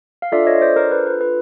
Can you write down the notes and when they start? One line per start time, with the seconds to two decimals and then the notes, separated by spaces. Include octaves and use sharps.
0.22 F5
0.32 D4 F4 A4 D5 E5
0.47 C#5 D#5
0.62 C5 D5
0.76 A#4 C5
0.91 B4
1.06 B4
1.21 B4